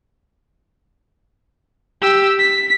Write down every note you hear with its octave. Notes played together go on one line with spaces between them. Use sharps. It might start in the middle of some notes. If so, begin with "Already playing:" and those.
G4 E6
B6